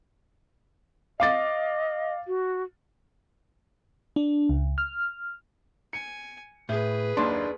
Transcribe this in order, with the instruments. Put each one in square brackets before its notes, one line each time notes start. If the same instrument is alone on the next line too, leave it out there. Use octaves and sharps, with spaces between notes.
[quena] D#5 [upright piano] F5 D6 A6
[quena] F#4
[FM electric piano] D4
C#2
F6
[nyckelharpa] G#5 [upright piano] C#7
[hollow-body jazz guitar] A2 [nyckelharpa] G#4 B4
[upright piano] F#1 D#2 C6 [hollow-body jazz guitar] D4